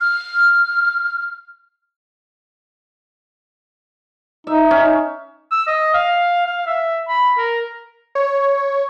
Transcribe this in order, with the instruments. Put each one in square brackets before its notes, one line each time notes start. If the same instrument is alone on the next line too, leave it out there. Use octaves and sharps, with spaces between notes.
[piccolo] F6
[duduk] D#4 [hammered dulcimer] E5
[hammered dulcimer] C#4
[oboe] E6
D#5
F5
F5
E5
B5
A#4
[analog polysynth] C#5